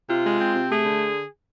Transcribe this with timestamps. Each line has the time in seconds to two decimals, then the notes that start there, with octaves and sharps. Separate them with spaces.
0.09 C3 F4
0.24 G#3
0.39 C4
0.54 C3
0.70 A3 G#4
0.85 D3